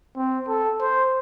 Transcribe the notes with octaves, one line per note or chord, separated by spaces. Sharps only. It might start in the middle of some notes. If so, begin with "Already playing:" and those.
C4
A4
C5